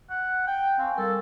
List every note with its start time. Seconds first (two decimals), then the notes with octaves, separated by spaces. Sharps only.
0.10 F#5
0.47 G5
0.79 C4 F5 G#5 C#6
0.98 G3 A4 A#4